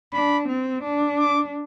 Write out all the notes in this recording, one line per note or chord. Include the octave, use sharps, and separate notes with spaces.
D4 B5
C4
D4
D6